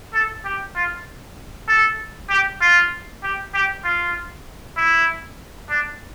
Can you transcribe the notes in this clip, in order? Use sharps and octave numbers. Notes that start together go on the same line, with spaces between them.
A4
G4
F4
A4
G4
F4
G4
G4
F4
E4
D4